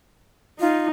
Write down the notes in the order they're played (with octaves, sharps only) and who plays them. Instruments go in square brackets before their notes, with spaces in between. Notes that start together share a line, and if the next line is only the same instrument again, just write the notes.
[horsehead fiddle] D#4 [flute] F4